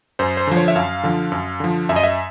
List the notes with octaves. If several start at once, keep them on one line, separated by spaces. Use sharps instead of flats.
F#2 C5
C5
D3 F3
C#5
E5
F#2 F5
D3 F3
F#2
D3 F3
F#2 E5
D#5
E5